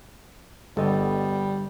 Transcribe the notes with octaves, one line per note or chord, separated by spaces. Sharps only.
G1 G3 B3 A4 D#5